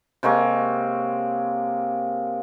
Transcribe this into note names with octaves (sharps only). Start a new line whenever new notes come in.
C3 G#3 A#3 C#5